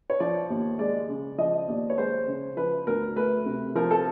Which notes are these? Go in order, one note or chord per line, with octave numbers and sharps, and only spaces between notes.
C#5
F3 D5
D#2
G#3 D5
C#3
F3 D#5
D#2 D5
C#5
G#3 C5
C#3
F3 B4
D2 A#4
A3 B4
C3
F3 A#4
A4